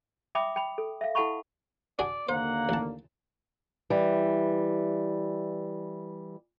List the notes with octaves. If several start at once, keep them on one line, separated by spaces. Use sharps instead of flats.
E5 G5 B5 D6 D#6
G5 B5
A4
E5 F5
E4 A4 F#5 A5 B5 C#6
D4 F#4 G#4 D5
D#2 D3 A#3 C5 F#5
A1 A5
E3 G3